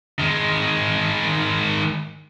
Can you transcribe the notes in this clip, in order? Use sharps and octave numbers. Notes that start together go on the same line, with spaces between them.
D#3 G#3